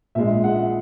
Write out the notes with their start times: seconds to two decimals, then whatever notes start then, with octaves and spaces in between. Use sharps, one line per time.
0.15 A#1 A#2 G#3 E5
0.44 F#5